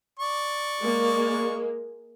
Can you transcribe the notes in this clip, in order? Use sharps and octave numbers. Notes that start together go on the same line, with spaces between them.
D5 C#6
G#3 A#3